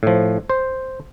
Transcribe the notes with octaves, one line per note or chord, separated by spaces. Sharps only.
A2 F3
C5